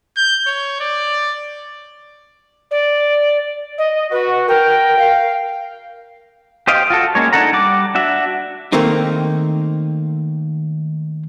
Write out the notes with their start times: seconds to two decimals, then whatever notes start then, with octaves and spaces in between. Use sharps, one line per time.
0.17 G6
0.47 C#5
0.80 D5
2.71 D5
3.78 D#5
4.11 F#4 B4
4.48 A#4 G5
4.99 F5
6.67 G4 C5 D#5 F5 G5
6.90 F4 F#4 A4
7.15 G#3 A#3 C#4 C#5
7.33 D4 D#4 A4 F#5 A#5
7.53 G3 F#5 D6
7.95 D4 F#4 E5
8.72 D#3 A3 A#3 C4 D#4